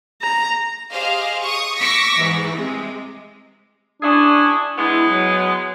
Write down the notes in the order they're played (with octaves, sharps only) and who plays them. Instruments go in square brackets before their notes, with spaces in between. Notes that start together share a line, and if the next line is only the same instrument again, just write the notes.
[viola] A#5
[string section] G4 G#4 C5 D#5 F5
C#6 D#6
C#6 D6 E6 A#6 B6 C#7
G#2 E3
C3 G#3
[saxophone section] C#4 E4 G#4 [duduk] D4
[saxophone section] G#3 B3 [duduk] E4
[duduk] F#3